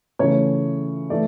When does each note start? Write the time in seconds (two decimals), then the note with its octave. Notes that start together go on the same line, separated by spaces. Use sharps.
0.19 C#3 E3 A3 C#5
1.10 E3 A3 D5